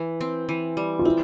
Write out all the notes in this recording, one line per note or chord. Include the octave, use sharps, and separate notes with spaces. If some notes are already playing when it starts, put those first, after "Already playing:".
Already playing: E3
C4
E3
G3
F4
C4 E4